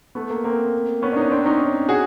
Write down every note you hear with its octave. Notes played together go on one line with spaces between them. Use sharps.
A3 B3
A#3
A#3 C4
B3 C#4
D4
C#4 D#4
C4 D4
C#4 D#4
F#4 G#4